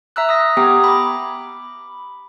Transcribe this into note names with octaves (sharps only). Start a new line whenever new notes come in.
E5 A#5 E6 F#6
D#6 A#6
B3 G4 G5 A#5 D#6
B5 D6